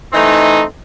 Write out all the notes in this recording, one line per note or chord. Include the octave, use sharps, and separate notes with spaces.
E3 A3 C4 D#4